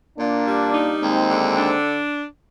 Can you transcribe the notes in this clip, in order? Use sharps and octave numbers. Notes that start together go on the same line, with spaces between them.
A#2 A#3 D4
G3
D#4
D#2 G#3 C4
D3
D4